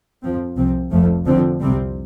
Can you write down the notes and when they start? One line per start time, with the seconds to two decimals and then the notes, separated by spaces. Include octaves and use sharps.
0.22 F2 F3 C4
0.56 C2 C3 F3 C4
0.91 F1 F2 F3 A3
1.26 F2 D3 F3 C4
1.61 C2 C3 G3 C4